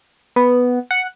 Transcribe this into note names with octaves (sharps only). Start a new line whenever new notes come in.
B3
F#5